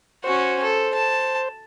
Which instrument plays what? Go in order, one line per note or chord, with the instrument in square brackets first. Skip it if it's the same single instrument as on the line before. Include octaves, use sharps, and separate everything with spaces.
[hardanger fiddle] C#4 F#4 [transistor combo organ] C5
[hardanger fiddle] A4
A5